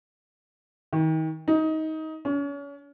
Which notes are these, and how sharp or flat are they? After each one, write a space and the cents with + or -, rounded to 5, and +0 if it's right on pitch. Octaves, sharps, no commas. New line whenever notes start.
D#3 +35
D#4 +20
C#4 +35